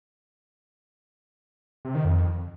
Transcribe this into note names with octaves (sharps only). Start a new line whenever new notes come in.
C3
D#3
F2